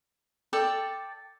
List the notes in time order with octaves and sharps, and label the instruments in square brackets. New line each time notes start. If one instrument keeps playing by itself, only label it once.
[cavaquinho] A4 D5 G5 A5